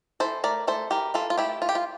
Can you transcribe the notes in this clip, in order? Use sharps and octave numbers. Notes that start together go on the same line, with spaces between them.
E3 A4 C5
A3 A#4 D5
A3 A4 C5
E3 G4 A#4
E3 F4 A4
F4
A3 E4 G4
E3 F4
G4
F4